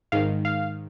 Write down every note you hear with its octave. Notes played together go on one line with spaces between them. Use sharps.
G#2 D#3 F5
F5